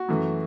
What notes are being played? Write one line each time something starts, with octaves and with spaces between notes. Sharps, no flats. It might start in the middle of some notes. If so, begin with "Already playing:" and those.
Already playing: F#4
F#2 E3 A3